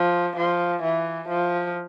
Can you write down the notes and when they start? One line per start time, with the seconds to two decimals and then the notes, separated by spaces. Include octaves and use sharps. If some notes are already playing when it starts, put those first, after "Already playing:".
Already playing: F3
0.37 F3
0.83 E3
1.29 F3